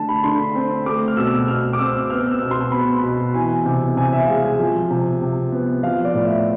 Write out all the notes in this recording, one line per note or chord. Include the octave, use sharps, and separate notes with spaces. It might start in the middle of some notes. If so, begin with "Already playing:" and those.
Already playing: D3 A3 A5
B5
D3 C6
C4
A3 D6
F6
B2 E6
B2 F6
D6
C4 E6
B3 F6
E6
B2
C6
B3 B5
B2 B5
E3 G#5
C3
C3 G#5
E5
G#3 F5
G#5
F3
C3
C3
B3
F3 F5
D5
A2
E5